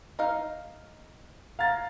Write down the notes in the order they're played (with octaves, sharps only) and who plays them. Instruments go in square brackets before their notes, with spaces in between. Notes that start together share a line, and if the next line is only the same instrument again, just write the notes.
[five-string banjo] D#4 F5
[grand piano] F5 A#5 A6